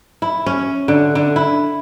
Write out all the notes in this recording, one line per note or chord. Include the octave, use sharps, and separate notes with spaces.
E4
C#4
D3
D3
E4